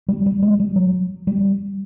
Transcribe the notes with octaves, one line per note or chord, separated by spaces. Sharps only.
G3
G3
G#3
G3
F#3
G3